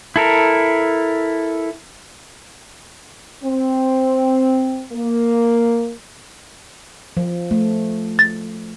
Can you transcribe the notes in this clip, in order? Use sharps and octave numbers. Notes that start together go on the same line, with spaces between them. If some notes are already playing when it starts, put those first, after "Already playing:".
E4 A4 A#4
C4
A#3
F3
A3
A6